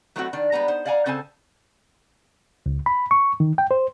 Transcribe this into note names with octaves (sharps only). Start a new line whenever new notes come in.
F#3 A3 B3 C4 E4 F#4
D#3 D4
G3 G#3 B3 A#5
D#4 C5
D5 F5 F#5 G#5 A#5
C#3 C4 A4 C5 G#5 A5
C#2
B5
C#6
D#3
G5
C5